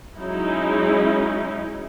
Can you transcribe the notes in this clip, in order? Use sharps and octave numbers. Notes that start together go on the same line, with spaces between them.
F#3 G#3 C#4 D#4 E4